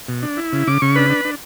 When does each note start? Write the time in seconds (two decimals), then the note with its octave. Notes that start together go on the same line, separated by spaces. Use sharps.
0.09 B2
0.23 D4
0.37 E4
0.53 C#3
0.67 C#3 D6
0.82 C#3 C#6
0.96 D4 B4 B5
1.10 D4
1.25 D4